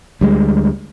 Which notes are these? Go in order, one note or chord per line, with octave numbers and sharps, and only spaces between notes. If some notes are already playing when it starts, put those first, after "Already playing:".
D2 G3 G#3